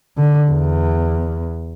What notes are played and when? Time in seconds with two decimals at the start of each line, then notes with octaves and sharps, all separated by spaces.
0.17 D3
0.50 E2